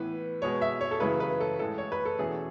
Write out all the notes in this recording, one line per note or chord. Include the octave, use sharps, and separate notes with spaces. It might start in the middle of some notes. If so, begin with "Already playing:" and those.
Already playing: A2 E3 B3 B4
B2 G#3 B3 C#5
E5
C#5
A4
F#2 C#3 E3 A3 C#4 B4
B4
A4
A2 E3 G#3 A4
C#5
B4
A4
E2 B2 A3 C#4 G#4